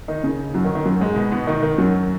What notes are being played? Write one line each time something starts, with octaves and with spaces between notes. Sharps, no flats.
D#3 D#4
C#3
F#2 F#3
D#3
D#3
F#2 F#3
G#2 G#3
B2 B3
B2 B3
D#3 D#4
D#3
F#2 F#3